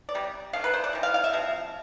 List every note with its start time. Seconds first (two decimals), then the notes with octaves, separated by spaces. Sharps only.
0.09 D5
0.15 C3 G3
0.53 D3 A3 F5
0.64 B4
0.74 C5
0.84 D5
0.93 C3 E3 G3
1.03 F5
1.14 F5
1.24 E5
1.33 C3 F3